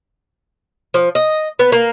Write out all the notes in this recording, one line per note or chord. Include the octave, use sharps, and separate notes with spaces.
F3
D#5
B3
A#3